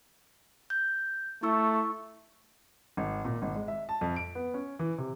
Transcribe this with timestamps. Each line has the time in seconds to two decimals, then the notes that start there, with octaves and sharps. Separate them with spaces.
0.70 G6
1.43 A3 E4 C#6 E6
2.97 G#1
3.25 A#2
3.42 G#1
3.55 G#3
3.68 E5
3.89 A5
4.01 F2
4.16 D7
4.35 B3
4.54 C#4
4.79 E3
4.98 C3